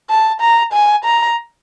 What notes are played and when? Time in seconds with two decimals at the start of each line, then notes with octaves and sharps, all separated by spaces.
0.10 A5
0.41 A#5
0.73 G#5
1.05 A#5